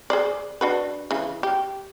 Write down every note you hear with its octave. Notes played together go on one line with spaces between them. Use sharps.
G#4 C5 D5
D4 F#4 B4
C#3 E3
G4